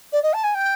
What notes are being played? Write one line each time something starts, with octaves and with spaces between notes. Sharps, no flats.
D5
D#5
A5
G#5
G5